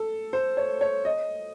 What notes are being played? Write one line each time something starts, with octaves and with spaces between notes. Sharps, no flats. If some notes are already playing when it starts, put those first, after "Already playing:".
Already playing: A4
C5
C#5
C#5
D#5